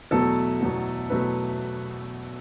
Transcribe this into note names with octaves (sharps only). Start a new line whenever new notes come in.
E2 B2 F#3 A3 A4
E2 B2 F#3 A3
E2 B2 F#3 A3 B4